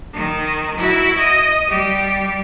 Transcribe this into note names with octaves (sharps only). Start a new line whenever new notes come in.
D#3
E4 F#4
D#5
G3 G4